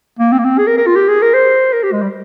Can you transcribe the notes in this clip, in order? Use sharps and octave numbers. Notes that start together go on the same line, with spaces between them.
A#3
C4
A#3
C4
G#4
A#4
A#4
F4
G4
G#4
A#4
C5
A#4
G4
G#3
G3